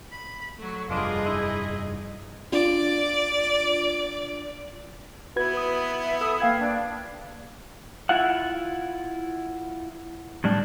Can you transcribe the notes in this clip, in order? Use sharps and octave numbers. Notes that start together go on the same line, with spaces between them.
B5
F#3 A3
F1 G2 B3 D4 F4 G#4 D#5
D#4 E4
D4 F4 D5
B3 E4 F#4 B4 G#6
D#6
E5
A4 D#6 E6
A#3 F5 G5 G#6
D4
E4 F4 E5 F#5
A2 G3 D4